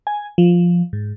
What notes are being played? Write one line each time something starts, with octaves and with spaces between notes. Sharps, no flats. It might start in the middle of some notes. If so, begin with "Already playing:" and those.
G#5
F3
G#2